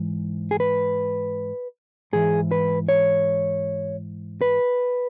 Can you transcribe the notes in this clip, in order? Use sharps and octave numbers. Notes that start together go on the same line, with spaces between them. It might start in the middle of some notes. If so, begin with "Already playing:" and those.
Already playing: G#2 E3
G#4
B4
G#2 E3 G#4
B4
C#5
B4